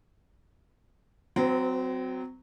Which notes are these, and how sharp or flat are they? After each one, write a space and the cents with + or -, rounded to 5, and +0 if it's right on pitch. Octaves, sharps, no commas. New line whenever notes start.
F#3 +0 C4 -25 B4 +45